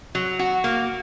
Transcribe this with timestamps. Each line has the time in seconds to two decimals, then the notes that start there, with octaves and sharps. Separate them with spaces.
0.15 F#3
0.39 F#4
0.64 A#3